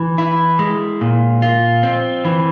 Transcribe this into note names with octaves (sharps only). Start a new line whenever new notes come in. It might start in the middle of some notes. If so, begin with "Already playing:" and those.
Already playing: E3
E4
G#3
A#2
F4
C4
E3